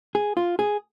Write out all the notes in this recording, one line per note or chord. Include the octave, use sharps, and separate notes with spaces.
G#4
F4
G#4